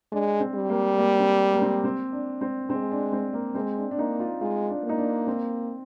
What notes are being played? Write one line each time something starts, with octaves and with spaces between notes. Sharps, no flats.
G#3 D4
C4
G3
A#3
A#3
C4
A#3
C4
C4
D4
C4
G#3 C4
D4
C4
A#3
G#3 C4
D4
D4
A#3 D#4
F4
G#3 F4
D4
A#3
D#4
D4
C4